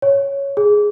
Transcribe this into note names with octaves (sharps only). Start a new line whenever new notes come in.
C#5
G#4